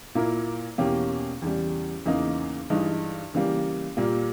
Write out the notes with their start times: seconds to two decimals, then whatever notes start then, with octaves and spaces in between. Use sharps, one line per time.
0.15 A#2 A#3 E4 A#4
0.78 E2 B2 A#3 C#4 G4
1.42 E2 C#3 E3 G3
2.06 E2 C#3 E3 A#3 D#4
2.70 G2 E3 G#3 D#4
3.34 C#3 E3 G3 A#3
3.97 A#2 G3 A#3